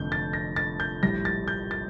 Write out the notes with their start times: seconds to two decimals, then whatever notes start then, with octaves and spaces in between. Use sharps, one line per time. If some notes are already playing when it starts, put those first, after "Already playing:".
Already playing: F1 F2 D3 G6
0.12 A6
0.33 A#6
0.56 A6
0.80 G6
1.02 A#1 A2 G3 A#6
1.25 A6
1.48 G6
1.71 A6